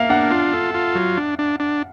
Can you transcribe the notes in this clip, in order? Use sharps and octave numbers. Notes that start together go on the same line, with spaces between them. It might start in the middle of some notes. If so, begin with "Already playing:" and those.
Already playing: A#3 E5 F5
D4 F#5
F4
A4
F4
F#3
D4
D4
D4